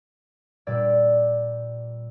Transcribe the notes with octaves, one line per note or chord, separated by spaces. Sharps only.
A#2 G3 D5 E6 G#6